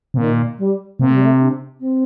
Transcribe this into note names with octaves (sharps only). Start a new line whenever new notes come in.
C3
A#2 D#3
G3
C3 A#3
A3
G3
A3
D4
C4